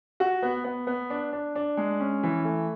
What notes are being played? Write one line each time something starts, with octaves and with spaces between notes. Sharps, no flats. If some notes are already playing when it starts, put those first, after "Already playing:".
F#4
B3
B3
B3
D4
D4
D4
G#3
C#4
E3
A3